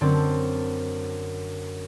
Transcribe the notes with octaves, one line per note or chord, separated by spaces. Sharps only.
F#2 D3 C4 D4 D5